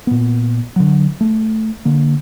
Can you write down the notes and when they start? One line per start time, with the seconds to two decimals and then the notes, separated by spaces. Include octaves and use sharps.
0.07 A#2 B3
0.76 D3 F#3
1.21 A3
1.85 D3 A#3